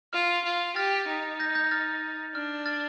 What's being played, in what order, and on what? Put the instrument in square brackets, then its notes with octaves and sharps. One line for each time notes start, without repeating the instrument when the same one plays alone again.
[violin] F4 [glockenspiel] F6
[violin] F4
[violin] G4 [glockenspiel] F6 A6
[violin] D#4
[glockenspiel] G6 A#6
G6 A#6
F6 A6
[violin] D4 [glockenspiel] F6
[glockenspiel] F6 A6